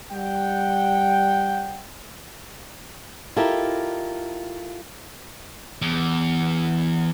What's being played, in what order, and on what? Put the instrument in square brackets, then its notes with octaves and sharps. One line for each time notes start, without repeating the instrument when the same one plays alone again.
[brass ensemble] G3 F#5 G5
[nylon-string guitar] E4 F4 G4 A4 A#4 D#5
[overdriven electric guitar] E2